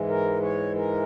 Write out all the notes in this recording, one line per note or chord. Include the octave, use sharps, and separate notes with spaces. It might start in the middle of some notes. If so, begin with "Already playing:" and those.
Already playing: G#2 E3 G#3
A#4
C#5
A#4